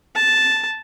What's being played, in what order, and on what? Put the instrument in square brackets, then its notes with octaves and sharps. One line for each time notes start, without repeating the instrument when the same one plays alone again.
[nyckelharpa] A5